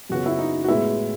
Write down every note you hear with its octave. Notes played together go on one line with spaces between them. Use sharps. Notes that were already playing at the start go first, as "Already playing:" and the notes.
F#2 C#3 F#3 B3 F#4
E4
D#4
F#4
A2 G#3 B3 E4